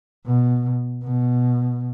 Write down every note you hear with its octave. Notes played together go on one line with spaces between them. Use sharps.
B2
B2